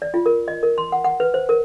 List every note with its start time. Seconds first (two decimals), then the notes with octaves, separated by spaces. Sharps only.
0.02 D5
0.14 F4
0.26 A#4
0.48 D#5
0.63 A#4
0.78 C6
0.92 F#5
1.04 F#5
1.20 B4
1.34 C5
1.49 A#4